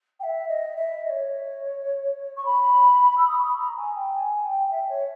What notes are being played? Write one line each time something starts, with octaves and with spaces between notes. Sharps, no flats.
G5
E5
D#5
E5
D#5
C#5
C#6
B5
E6
D#6
C#6
B5
A#5
G#5
G5
G#5
G5
E5
C#5